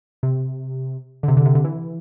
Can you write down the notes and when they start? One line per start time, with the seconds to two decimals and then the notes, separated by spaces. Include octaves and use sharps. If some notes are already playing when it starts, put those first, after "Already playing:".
0.23 C3
1.23 D3
1.28 C3
1.37 D3
1.46 C3
1.55 D3
1.64 E3